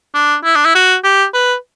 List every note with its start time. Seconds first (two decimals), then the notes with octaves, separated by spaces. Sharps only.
0.14 D4
0.44 E4
0.55 D4
0.65 E4
0.75 F#4
1.04 G4
1.34 B4